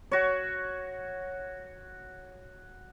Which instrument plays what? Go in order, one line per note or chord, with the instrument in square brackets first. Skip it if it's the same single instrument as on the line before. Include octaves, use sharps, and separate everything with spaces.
[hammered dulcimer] F#4 C#5